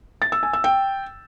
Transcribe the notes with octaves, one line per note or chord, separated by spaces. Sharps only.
A6
E6
G#5
E6
G5